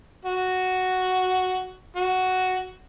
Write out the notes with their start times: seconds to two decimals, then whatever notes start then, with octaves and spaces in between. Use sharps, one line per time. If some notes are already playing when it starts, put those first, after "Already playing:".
0.25 F#4
1.96 F#4